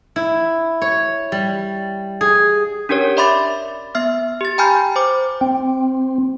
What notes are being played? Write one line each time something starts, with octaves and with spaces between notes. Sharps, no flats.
E4
C#5
G3
G#4
C#4 D4 G4 A#4 C#5
D5 E5 B5 C6 D6 A6
B3 E5 F6
G4 A6
G5 G#5 A#5 B5 F6 G6
C5 D6
C4